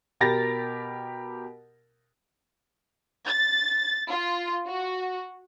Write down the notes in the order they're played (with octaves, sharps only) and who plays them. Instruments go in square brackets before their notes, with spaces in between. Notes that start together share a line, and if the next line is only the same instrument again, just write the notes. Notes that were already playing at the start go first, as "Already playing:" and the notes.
[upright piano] B2 G4 A#4 B5 A6 A#6
[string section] A6
F4
F#4